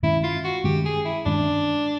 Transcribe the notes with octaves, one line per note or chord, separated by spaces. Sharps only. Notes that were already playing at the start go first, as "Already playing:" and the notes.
G2 D#3 G#3 C#4 E4
F4
F#4
G2 D#3 G#3 C#4 G4
G#4
E4
G2 D#3 G#3 C#4 D4